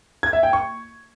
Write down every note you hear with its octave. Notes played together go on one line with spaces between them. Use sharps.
G#6
E5
G5
C#6